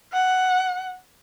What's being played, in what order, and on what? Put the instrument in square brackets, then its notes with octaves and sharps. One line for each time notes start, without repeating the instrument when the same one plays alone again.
[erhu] F#5